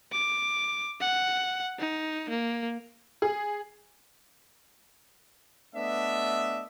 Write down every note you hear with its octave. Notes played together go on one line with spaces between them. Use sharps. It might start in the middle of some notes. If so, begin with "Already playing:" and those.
D6
F#5
D#4
A#3
G#4
A3 B3 D4 D#5 E5